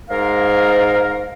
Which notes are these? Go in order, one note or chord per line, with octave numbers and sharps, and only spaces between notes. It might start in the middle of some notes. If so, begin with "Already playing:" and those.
G#2 A#4 F5